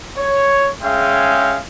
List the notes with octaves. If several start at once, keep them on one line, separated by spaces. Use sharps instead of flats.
C#5
G#3 C#4 G#4 E5 F5 G5